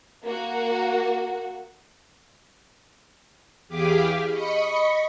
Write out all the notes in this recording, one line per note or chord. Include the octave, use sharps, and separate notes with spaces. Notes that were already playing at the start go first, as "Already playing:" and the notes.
A#3 F#4
E2 G4 G#4 F5 D6 B6
D#5 B5 C#6 C#7